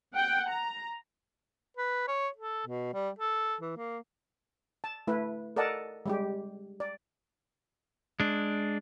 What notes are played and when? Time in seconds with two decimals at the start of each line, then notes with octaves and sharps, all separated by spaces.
0.14 F#5 G5
0.49 A#5
1.77 B4
2.08 C#5
2.37 A4
2.67 B2
2.94 G3
3.19 A4
3.61 E3
3.77 A#3
4.84 A5
5.07 A3 E4 B4
5.56 A4 A#4 D5 D#5 F#5 A5
6.06 G3 G#3 G4
6.80 D5
8.20 G#3 D4